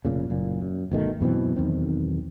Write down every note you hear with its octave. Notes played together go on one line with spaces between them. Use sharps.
F1 A#2 C#3
F#1 A#2
F#2
G1 B2 D#3 A3
F#2 B2 E3 C4
B1 E2 D#3 C4